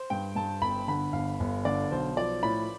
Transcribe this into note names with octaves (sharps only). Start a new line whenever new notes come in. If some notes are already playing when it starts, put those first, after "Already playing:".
Already playing: C5
G2 G5
G2 A5
G1 B5
D3 B5
G1 F5
G1
D3 D5
B1 C5
F3 D5
A2 B5